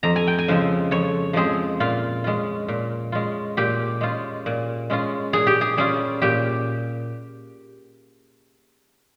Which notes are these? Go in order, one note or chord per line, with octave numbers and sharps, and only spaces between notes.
F2 A#5
G#5
G5
G#5
C#3 F3 G#3 C4
F2 C#5
C#3 F3 G#3 C4 G#4
A#2 F4
G#3 C#4 F4
A#2
G#3 C#4 F4
A#2 G4
G#3 C#4 F4
A#2
G#3 C#4 F4
A#2 G#4
G4
G#4
G3 C#4 F4 G#4
A#2 G4